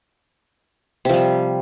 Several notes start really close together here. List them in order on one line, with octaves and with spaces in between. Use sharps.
C3 F3 G3